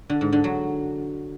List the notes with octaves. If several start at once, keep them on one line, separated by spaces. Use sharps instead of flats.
D3
G#2
D3
F#3